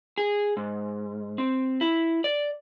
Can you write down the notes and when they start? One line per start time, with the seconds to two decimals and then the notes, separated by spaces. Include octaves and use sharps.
0.18 G#4
0.57 G#2
1.38 C4
1.81 E4
2.24 D5